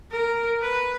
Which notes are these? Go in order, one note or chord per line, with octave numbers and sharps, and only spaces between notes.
A#4
B4